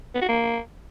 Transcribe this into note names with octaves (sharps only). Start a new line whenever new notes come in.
B3
F#4
A#3